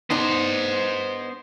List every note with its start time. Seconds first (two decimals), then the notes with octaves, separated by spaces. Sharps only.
0.10 B3 D4 D#4 C5 D#5